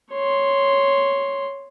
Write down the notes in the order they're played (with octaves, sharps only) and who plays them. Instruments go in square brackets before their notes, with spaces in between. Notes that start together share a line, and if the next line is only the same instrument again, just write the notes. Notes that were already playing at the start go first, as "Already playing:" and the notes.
[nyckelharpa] C#5 C6